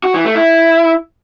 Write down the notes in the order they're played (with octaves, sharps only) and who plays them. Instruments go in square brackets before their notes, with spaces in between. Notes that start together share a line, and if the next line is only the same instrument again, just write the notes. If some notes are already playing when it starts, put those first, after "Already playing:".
[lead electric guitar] F#4
E3
A3
E4